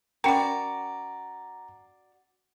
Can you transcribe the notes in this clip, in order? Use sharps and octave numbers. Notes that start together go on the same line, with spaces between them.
C#4 F#4 A#4 D5 G5 A#5